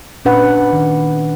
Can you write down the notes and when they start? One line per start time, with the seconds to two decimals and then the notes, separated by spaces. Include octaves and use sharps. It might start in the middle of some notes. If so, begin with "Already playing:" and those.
0.25 A#2 C#4 D4 B4 F#5
0.73 D#3